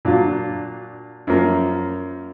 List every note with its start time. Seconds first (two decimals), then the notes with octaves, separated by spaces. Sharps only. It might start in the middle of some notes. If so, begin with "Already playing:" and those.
0.05 A#2 F#3 D4 F4
1.27 F#2 F3 A#3